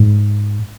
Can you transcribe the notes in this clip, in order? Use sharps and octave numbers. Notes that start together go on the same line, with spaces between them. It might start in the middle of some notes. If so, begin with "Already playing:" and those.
Already playing: G#2